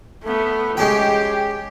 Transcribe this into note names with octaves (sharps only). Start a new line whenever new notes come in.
A3 B3
G#3 C#4 G4 G5